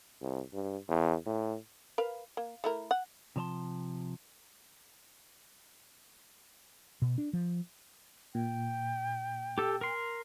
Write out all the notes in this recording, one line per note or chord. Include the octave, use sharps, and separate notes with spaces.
C2
G2
E2
A2
A#4 B4 F5
A#3
A3 E4 A#4
F#5
C3 F3 C#5 A5 C6
B2
D4
F3
A#2 G5
G4 A4
A#4 C6